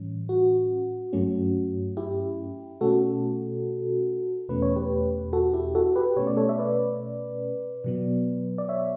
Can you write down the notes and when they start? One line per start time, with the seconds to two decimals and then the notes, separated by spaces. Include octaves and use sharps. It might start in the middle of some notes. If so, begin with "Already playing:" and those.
Already playing: A2 E3 G3 C#4
0.29 F#4
1.13 G2 F#3 A3 C#4
1.97 E4 G4
2.81 B2 A3 C#4 F#4 A4
4.49 E2 B2 A3 C#4 B4
4.62 C#5
4.76 G4 B4
5.33 F#4 A4
5.53 E4 G4
5.75 F#4 A4
5.96 G4 B4
6.17 B2 A3 C#4 C#5
6.27 D5
6.37 A4 C#5
6.49 E5
6.58 B4 D5
7.84 B2 F#3 B3
8.58 D5
8.69 C#5 E5